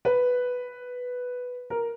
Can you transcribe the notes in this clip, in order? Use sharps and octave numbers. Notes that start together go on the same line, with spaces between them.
B4
A#4